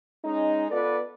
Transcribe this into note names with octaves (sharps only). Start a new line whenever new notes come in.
G#3 C#4 D#4
B3 F4 A4 B4 D5